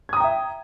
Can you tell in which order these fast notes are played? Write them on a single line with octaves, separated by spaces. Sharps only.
G#6 D#6 A#5 G5 E5